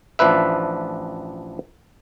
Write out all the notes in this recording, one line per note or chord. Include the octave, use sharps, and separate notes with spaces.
A1 F3 D4 B4 E5